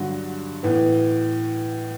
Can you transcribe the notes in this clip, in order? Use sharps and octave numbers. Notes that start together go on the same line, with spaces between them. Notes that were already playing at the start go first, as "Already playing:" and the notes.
Already playing: G2 D3 F#3 F#4
A2 E3 B3